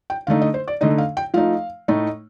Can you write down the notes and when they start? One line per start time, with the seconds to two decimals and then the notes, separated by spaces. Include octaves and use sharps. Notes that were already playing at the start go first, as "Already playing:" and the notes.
0.10 G5
0.27 D3 A3 D#4 F5
0.41 D#5
0.54 C5
0.68 D5
0.81 D3 A3 D#4 D#5
0.98 F5
1.17 G5
1.34 F3 A3 D#4 F5
1.88 A2 A3 D#4